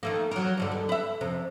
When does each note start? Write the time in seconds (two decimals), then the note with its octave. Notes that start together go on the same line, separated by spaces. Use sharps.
0.03 D#3 A3 A#3
0.31 F#3 A#4
0.58 E2 G2 D3
0.72 D#2
0.89 B4 E5
1.21 F2 C3